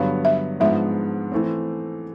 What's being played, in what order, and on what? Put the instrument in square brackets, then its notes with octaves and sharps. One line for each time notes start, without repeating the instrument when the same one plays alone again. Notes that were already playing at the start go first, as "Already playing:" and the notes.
Already playing: [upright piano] G2 D3 F#3 B3 [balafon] F5
[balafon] E5
[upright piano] G#2 F3 G#3 B3 D4 [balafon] E5
[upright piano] E3 A3 C4